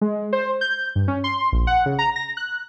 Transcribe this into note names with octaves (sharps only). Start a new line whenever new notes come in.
G#3
C5
G6
G2
C#4
C6
A#1
F#5
C#3
A#5
A#6
F#6